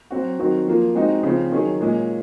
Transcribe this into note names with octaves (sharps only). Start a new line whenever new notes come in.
F#3 C4 F#4
D#3 F#3 C4 F#4
F3 A#3 F4
G#3 C4 D#4 F#4
C#3 F3 C4
D#3 F#3 C#4 G#4
A#2 G#3 C#4